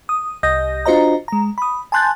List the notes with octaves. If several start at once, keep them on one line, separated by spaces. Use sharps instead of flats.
D#6
C2 D#5 D#6 G6 A#6
D4 F4 F#4 C5 D#5 A#5
G#3 A#5
B5 D#6
G#5 A5 C6 F#6 G6 A6